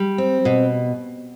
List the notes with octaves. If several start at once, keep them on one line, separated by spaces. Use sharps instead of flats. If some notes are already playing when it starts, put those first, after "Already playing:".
Already playing: G3
C4
B2